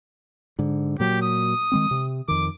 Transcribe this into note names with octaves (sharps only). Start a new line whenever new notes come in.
G#2 D3
A#2 F#3 G4
D#6
D#3 G#3 C4
C3
F2 D#3 D6